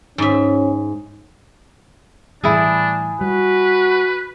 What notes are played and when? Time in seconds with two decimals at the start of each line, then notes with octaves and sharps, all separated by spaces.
0.18 G#2 C#4 E5
2.44 A2 E3 G3 D4 E4 G#4
3.21 G3 F#4 B4